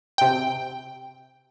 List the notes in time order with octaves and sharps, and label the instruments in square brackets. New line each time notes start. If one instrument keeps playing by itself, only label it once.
[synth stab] C3 G5